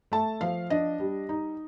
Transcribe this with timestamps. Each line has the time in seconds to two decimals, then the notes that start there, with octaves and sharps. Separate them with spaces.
0.12 A3 A5
0.41 F3 F5
0.70 D4 D#5
1.00 G3
1.29 D#4